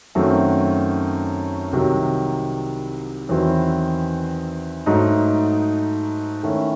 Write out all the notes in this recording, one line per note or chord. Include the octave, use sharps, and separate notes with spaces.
F#2 D#3 A3 C4 F#4
C2 C3 D#3 F#3
E2 D#3 F#3 C4 E4
G#2 F#3 A3 D#4
D#3 A3 C#4 E4